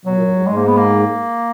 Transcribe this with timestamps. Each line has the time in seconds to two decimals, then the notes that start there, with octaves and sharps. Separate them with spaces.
0.05 B2 F#3
0.16 A#2
0.26 F#2
0.36 G#2
0.46 G#2 G#3
0.57 A#3
0.67 B3
0.77 A#3